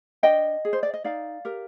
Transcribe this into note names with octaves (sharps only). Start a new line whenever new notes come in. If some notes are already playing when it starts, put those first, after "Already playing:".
D4 D#5 G5
G#4
C5
D5
D#5
D#4 D5 F5
G4 A#4